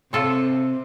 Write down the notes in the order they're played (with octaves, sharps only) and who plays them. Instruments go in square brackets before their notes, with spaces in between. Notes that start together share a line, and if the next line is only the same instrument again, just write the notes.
[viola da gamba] C3 [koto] F4 A4 C#5